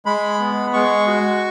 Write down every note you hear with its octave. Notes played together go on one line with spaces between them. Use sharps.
G#3 B5
B3
G#3 C#6
F#4